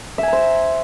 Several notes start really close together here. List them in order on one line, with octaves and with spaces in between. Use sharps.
E5 G#5 A#5 C5